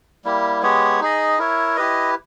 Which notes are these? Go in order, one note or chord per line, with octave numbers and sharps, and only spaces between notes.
G3 A#3 E4 G4
G#3 B3 G4 C#5
D#4 G#4 D#5
E4 A#4 C#5 E5
E4 G4 B4 D#5